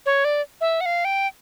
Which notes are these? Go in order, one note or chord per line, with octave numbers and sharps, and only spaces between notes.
C#5
D5
E5
F#5
F5
G5